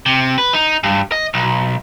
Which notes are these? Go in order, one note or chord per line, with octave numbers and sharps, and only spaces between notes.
C3
B4
D#4
G2
D#5
B1